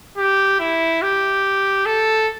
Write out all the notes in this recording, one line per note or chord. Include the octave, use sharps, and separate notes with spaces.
G4
E4
G4
A4